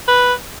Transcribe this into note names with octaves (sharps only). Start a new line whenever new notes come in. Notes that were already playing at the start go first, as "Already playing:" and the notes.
B4